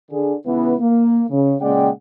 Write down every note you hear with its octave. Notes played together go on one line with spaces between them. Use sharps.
D3 G#4
C#2 E3 B3
A#3
C#3
A#2 C#3 G#3 D5 F#5 G5